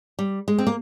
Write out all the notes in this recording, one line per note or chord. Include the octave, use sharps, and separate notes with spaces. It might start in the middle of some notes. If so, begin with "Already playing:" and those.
G3
G#3
C4
A#3